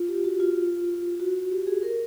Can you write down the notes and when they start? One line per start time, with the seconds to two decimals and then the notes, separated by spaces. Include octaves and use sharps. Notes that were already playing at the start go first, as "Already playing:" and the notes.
Already playing: F4
0.08 G4
0.24 F#4
0.40 F4
1.20 F#4
1.51 G4
1.67 G#4
1.83 A#4